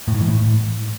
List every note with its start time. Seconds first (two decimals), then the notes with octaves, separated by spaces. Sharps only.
0.08 A2
0.14 G#2
0.21 E3
0.28 A2